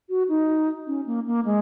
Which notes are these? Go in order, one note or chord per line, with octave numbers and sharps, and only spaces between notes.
F#4
D#4
C#4
A#3
A#3
G#3